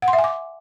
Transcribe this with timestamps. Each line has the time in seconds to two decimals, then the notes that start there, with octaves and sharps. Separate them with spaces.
0.02 F#5
0.08 C6
0.13 E5
0.19 G#5
0.24 D6